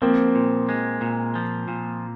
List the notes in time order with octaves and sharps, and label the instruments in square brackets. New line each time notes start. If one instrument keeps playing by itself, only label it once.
[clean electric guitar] F3 [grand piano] A#3 C4
[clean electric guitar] A#2
G#3
A#2
F3
A#2